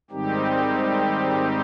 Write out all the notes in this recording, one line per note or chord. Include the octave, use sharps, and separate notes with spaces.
G#2 D#3 G3 C4 D#4 G4